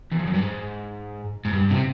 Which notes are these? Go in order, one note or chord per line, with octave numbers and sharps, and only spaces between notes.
E2
F2
F#2
G2
G#2
G#2
G2
C3